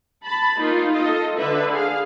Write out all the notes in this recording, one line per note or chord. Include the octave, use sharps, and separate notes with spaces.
A5 B5
A#3 D#4 F4
F4 A4 D#5
D3 B4 E5
G#4 F5